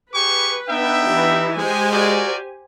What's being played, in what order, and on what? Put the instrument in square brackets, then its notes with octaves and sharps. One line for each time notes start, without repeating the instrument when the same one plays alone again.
[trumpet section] G4 G#4 C#6 [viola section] B4
[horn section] B3 D4 G5 [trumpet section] D#4 E5
[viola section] E3 E4 G4
[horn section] G#3 [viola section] G4 C5 G#5
[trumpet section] F#4 A#4 D5